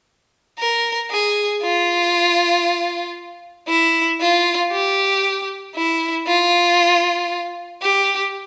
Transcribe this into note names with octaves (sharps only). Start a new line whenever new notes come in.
A#4
G#4
F4
E4
F4
G4
E4
F4
G4